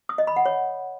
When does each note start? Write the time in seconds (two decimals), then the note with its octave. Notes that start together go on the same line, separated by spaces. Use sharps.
0.09 D#6
0.18 D#5
0.27 B5
0.36 F#5
0.46 C#5